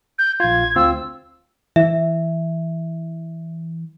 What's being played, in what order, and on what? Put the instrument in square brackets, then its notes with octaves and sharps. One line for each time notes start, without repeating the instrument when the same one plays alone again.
[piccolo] G6
[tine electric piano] A#1 F4 [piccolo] G#6
[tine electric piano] D2 C4 F4 [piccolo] E6
[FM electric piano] E3 [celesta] E5